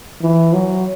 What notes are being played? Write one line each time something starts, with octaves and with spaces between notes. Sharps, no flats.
E3
F#3